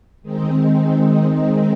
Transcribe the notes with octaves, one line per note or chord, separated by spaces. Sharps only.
D#3 G#3 C4 D#4